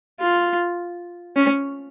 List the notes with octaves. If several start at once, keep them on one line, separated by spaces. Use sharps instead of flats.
F4
C#4